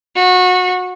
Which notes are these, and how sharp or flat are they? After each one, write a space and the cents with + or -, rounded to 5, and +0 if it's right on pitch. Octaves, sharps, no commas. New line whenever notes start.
F#4 -25